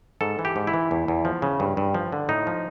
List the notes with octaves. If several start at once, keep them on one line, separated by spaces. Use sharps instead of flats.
G#2 A4
E3
G4
G#2
E4
E3
E2
E2
F3
C#3
G2
G2
F3
D3
A2 D#4
F3